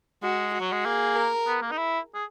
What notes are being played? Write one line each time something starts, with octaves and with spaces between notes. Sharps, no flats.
G#3 F#4
F#4
F#3
G#3
A#3 G#4
A#4
B3
A#3
D#4
E4
G#4